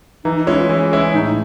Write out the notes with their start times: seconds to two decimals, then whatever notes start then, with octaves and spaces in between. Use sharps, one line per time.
0.24 E3 D#4
0.35 D#4
0.46 G#3 C#4 E4 F4
0.58 F4
0.69 E3 E4
0.92 G#3 C#4 E4
1.14 A2 D#4